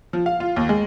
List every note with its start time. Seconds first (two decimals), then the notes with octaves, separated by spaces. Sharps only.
0.13 F3
0.26 F5
0.40 F4
0.57 D#2
0.69 G#3